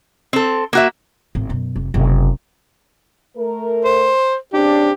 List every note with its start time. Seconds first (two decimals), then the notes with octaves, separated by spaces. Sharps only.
0.33 C4 A4
0.73 A#3 F#4 E5
1.35 G#1 A2
1.49 F#2 B2
1.76 F1
1.94 F#1 C3
3.36 A3 A#4
3.84 C5
4.53 C#3 C4 D4 G4